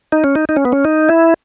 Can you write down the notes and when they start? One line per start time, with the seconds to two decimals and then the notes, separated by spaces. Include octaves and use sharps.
0.12 D#4
0.24 C#4
0.35 D#4
0.49 D#4
0.56 C#4
0.65 B3
0.72 C#4
0.85 D#4
1.09 E4